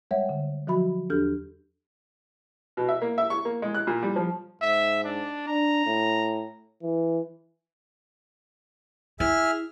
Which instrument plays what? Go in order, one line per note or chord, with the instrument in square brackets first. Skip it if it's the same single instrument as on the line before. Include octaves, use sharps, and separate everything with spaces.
[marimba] G3 G#3 C#5 E5 F#5 G5
D3
F3 F#3 F#4 B5
E2 D4 G4 A4 F6 G6
[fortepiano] B2
E5
A#3
E5
C#6
A#3
G#3
F#6
A#2
G3
F3
[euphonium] G#2 [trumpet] E5
[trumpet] D4
[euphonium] D4 [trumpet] A#5
[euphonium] A2
E3
[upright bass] E4 [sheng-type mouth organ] G#4 E5 F6